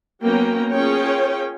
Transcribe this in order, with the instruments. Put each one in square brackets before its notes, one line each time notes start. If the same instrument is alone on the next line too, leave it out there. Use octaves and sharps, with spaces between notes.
[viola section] F#3 A#3 B3 C#4 G5 A#5
C#4 F4 G#4 A#4 C#5 G5